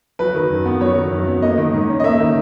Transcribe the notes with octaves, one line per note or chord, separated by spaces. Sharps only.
F#3 B4
D#3
F#2
B3
F#3 C#5
D#3
F#2
B3
A#3 D#5
D#3
G#2
C#4
D#5
A#3 E5
D#3